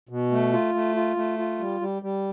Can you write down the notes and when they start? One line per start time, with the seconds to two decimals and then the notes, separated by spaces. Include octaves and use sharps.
0.09 B2
0.31 A3
0.53 F4
0.74 A3
0.96 F4
1.16 A3
1.39 F4
1.59 G3
1.81 G3
2.02 G3